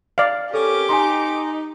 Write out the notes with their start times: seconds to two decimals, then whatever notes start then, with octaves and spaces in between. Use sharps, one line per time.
0.18 D5 F5
0.54 C#4 G4 A4 A#4 D6
0.89 D#4 G#5 A#5 C6